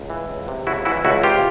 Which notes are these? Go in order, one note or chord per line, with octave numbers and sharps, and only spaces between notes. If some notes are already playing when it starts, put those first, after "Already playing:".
Already playing: C#2
E3
C#2
C3
C#2 E4 F#4
E3 E4 F#4
C#2 E4 F#4
C3 F4 G4